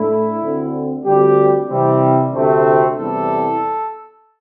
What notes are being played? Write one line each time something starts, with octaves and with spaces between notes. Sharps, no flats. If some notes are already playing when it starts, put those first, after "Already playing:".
Already playing: A2 A3 D4 E4
D2 D3 C4
D2 D3 G3 C4 G4
C3 E3 G3 C4
D2 C3 A3 C4
E2 C3 G3 A4